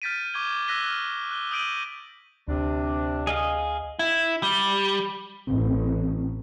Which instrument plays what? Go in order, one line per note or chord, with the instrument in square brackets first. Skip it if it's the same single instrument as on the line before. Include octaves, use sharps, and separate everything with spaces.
[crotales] F6 G6 A6 B6 D7 D#7
C#6 D6 G6 G#6 G7
E6 F#6 A#6 B6 D#7 G7
F6 F#6
F#6 G7
D#6 G6 D7 D#7 F#7
[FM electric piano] D2 [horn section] C3 D4
[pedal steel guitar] G#4 D#5 F5
[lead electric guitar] E4
G3
[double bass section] A1 [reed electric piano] C4